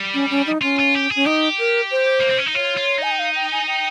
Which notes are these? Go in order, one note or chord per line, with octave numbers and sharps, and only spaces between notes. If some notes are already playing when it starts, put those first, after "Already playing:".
Already playing: G3
C#4
C#4
D#4
C#4 F4
F4
G4
G#4
C#4
D#4 G4
A#4
C5
A#3
C4
C#4
D#4
F4 C#5
F4
D#4 G#5
G5
F5
G5
G#5
G5